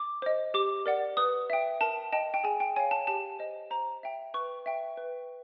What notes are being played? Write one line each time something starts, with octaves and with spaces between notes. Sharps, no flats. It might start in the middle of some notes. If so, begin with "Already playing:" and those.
Already playing: D6
C5 D#5
G4 D6
A#4 D5 F#5
B4 D#6
E5 G5
A#4 A5
D#5 G5 A5
G5
G#4 G#5
G5
C#5 F5 G#5
A5
G4 A5
C5 D#5
C5 A#5
E5 G5
B4 C#6
E5 G5
B4